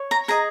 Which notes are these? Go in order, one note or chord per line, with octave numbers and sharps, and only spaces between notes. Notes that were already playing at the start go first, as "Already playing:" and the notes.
Already playing: C#5
A#5
G#4 D#5 A#5